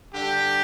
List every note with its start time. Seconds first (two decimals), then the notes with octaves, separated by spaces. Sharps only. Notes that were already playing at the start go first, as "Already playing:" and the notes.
0.14 D3 G3 D4 G4